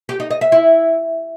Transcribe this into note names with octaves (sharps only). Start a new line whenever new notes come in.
G4
D#4
D#5
E5
E4